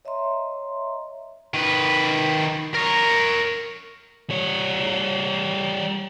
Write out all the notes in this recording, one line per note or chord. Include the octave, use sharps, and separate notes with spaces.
C#5 D#5 E5 A#5 C6
D#3 B4
A#4 C#5
G3 C#5